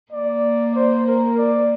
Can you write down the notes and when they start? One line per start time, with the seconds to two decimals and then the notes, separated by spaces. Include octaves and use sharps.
0.12 A#3 D5
0.76 C5
1.07 A#4
1.38 D5